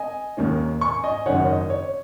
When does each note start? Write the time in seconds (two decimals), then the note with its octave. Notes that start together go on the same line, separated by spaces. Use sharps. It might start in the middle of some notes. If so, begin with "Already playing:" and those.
Already playing: D#5 G#5
0.37 D#2 D#3 A#3 C#4
0.81 G#5 C#6
1.04 D#5 G#5
1.26 F#1 F#2 D#3 C#5 F#5
1.48 D#5
1.70 C#5